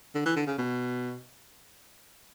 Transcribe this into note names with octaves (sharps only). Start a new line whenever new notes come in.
D3
E3
D3
C#3
B2